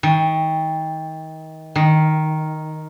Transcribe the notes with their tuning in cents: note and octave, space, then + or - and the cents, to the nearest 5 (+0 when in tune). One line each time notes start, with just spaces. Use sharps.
D#3 +30
D#3 +0